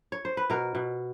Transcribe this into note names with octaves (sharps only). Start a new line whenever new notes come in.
C#5
C5
B4
B2 A#4
B2